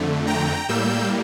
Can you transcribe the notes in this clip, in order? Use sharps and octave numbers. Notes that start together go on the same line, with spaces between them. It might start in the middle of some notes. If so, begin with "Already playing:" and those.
Already playing: F2 D3 A3
G5 A#5
A2 G3 A#3 E6 G6